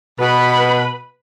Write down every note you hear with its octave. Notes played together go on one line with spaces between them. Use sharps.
B2 B4 B5